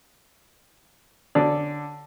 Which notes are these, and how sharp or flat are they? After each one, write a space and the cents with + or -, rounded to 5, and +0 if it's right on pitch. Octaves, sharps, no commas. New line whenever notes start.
D3 +0 C#4 +20 D5 +0